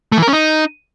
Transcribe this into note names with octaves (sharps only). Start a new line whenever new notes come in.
A3
E3
A#4
C#4
D#4